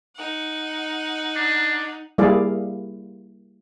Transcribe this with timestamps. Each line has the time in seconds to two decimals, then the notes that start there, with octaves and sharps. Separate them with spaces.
0.16 D#4 F#5
1.36 D4
2.18 G3 A#3 E4 G#4 D5 F5